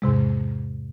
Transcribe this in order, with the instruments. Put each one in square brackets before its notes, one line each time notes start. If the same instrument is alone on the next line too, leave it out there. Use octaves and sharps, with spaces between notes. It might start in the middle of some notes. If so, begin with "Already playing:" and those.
[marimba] E2 G#2 C3 G#3